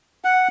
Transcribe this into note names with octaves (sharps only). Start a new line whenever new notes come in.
F#5